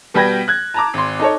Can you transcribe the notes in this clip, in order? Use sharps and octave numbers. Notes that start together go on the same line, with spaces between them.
B2 G3 B4 G5 G#6 A#6
F#6 G#6
A5 A#5 D6
G#1 C6
D#4 A4 C#5